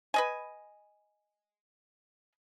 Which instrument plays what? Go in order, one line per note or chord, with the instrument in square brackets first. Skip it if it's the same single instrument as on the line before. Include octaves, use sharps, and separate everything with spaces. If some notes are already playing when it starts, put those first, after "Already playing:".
[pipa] B4 D#5 G#5